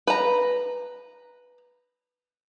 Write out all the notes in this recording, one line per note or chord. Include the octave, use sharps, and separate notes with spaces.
B4 A#5